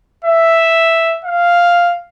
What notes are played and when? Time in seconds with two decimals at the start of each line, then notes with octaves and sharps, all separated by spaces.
0.24 E5
1.25 F5